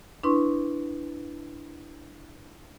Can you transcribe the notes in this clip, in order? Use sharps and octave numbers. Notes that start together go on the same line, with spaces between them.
D4 E4 B4 C6 C#6